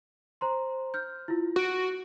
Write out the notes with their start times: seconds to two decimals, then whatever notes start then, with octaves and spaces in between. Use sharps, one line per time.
0.41 C5 A#5 C6
0.94 F6 G6
1.28 E4 F4
1.56 F#4 F#6 D7